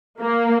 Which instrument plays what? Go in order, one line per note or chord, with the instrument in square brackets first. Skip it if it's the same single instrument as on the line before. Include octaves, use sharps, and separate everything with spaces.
[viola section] A#3